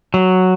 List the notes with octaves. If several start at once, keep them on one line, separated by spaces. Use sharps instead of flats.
F#3